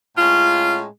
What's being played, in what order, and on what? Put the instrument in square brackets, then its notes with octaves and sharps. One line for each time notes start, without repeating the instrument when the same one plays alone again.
[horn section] A2 G#3 C#4 F4